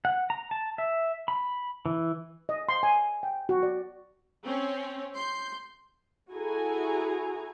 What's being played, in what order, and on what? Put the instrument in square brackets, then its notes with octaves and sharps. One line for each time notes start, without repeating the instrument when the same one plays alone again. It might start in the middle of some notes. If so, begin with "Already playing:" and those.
[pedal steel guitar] F#5
A#5
A5
E5
B5
E3
[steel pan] D#5
C6
G#5
G5
F#4
D5
[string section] C4 C#4 C#5
[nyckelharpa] C6 [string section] G6
[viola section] E4 F#4 G#4 A4 G#5 A#5